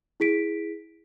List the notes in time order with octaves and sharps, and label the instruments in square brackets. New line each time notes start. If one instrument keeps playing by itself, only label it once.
[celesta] E4 G#4 B6 D7